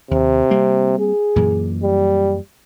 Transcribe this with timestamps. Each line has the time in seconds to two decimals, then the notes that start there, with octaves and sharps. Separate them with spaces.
0.11 D#2 C3
0.51 G3 A#3 C4
0.99 G#4
1.36 F#2 A#2 E3
1.83 G3